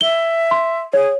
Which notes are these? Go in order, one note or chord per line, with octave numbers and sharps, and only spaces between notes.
E5 G7
C6
G#4 C#5